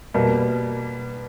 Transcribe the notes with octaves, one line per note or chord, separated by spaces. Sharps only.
B2 G3 A#3